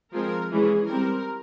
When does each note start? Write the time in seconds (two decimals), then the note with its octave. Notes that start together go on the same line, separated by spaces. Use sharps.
0.13 F3 G#3 C4 A#4
0.51 E3 G#3 C#4 G#4
0.88 G3 C4 A#4